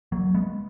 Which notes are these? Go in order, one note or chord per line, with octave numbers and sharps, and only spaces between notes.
F#3 A#3
G#3 B3